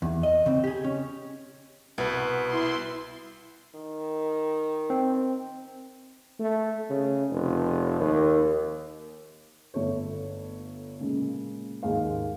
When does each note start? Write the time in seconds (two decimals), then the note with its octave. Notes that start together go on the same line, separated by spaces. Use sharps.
0.02 E2
0.23 D#5
0.46 C#3 C4
0.64 G4 G#4
0.84 C#4
1.98 C2 B2 B4
2.48 E4 C6
3.75 D#3
4.90 C4
6.39 A3
6.90 C#3
7.30 F1
8.00 D#2
9.74 G1 A3 C#5
10.99 A#2 C#3 G#3
11.83 D#2 G#2 G#3 F5